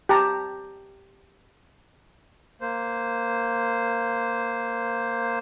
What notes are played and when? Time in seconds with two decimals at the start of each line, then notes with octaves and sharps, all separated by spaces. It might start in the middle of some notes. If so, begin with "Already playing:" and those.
0.09 G4 A5 A#5
2.61 A#3 C5